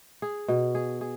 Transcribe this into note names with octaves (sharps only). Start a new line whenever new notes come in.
G#4
B2
G#4
G#4